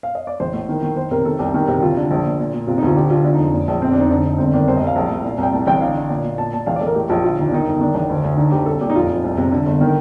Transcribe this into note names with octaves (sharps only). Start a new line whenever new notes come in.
F5
D#5
D5
A1 C5
A2
D#3
D#3
D#3 C5
C3 A#4
D#3 A4
C2 G4
D#3
C3
D#2 F4
D3
A#1
A#2
A#2
A#2
C3 F4
D#4
D2 F4
D3 G4
D3 F4
D3 F4
D#4
F1
A#2
A#1
F1 C4
D4
F1 D#4
D3 D#4
D3
G1 C4
D#3 D4
C2 C5
D#5
C2
F5
A#1
A2
A#2
C2 G5
A2 A5
A1 G5
D3 F5
D3
A#2
A#2
A#2 A5
A#2 A5
A1 F5
D5
A1 A4
A#4
A2 G4
A#1 F4
D3 F4
D#2 D#4
D4
D#3 D#4
G1 D#4
D#3 D4
A1
D2
D2
D3 D#4
D2 G4
C2 A4
A#2 G4
D#4
F1 F4
F1
C2
C3
D3
G1
D#3